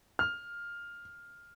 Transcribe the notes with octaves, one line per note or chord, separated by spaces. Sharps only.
F6